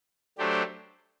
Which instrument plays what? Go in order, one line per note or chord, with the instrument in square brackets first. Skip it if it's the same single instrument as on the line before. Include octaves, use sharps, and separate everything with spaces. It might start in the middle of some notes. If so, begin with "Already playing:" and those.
[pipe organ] F#3 A3 D4 G4 C5